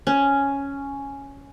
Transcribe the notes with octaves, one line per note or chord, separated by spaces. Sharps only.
C#4